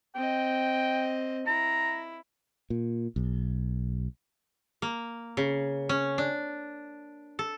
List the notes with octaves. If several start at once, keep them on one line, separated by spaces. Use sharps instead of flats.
C4 D#5 G5
E4 A#5
A#2
B1
A#3
C#3
C#4
D4
A4